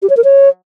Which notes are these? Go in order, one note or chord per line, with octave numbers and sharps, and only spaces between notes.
G4
C#5
A#4
C#5